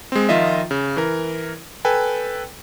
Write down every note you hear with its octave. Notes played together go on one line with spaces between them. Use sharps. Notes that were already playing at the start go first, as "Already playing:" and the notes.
G#3 C4
D#3 F3 F4 D#5 E5
C#3
E3 A#4
A4 B4 G5 G#5